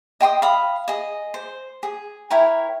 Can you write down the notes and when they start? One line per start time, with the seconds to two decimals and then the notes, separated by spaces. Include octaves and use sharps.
0.21 D#5 G5 C6 D#6
0.42 F5 B5 D#6
0.88 G#4 D#5
1.34 C5
1.83 G#4
2.30 E4 A#4 C#5 G5